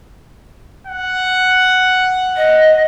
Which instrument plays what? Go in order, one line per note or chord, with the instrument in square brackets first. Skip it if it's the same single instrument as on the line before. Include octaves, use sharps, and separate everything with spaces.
[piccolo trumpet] F#5
[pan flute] D#5